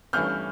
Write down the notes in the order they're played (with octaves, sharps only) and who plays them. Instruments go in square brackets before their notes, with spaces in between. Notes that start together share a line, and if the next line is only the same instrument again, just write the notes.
[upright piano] G1 G2 E3 A3 C#4 F6 G6